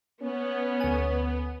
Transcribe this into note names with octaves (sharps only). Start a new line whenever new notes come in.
B3 C#4
D2 G#5